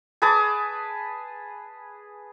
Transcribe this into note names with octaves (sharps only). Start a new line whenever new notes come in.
G#4 B4 A5 D6